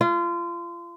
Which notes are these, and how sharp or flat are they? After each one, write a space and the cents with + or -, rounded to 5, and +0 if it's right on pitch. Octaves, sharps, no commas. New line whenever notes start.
F4 -30